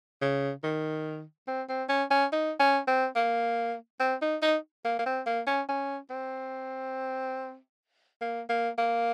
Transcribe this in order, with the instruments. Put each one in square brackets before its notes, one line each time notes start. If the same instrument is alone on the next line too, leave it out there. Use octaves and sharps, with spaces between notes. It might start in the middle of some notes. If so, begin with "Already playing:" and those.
[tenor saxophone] C#3
D#3
C4
C4
C#4
C#4
D#4
C#4
C4
A#3
C4
D#4
D#4
A#3
A#3
C4
A#3
C#4
C#4
C4
A#3
A#3
A#3